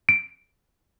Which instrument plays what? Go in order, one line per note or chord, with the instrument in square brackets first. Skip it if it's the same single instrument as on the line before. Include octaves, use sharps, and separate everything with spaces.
[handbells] D7